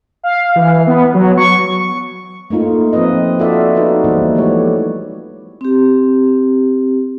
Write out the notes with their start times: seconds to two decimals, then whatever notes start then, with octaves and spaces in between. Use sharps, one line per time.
0.23 F5
0.56 E3
0.87 B3
1.14 F#3
1.38 C#6
2.50 A3 A#3 D#4 F4
2.93 F3 C4 F4 B4 D#5
3.39 F4 F#4 A4 D5 E5
3.75 B3 D#4 F#4 G#4 B4
4.04 E3 G3 A#3 E4 C5
4.35 E3 F3 G#3 A3 G4 C#5
5.61 C4 G4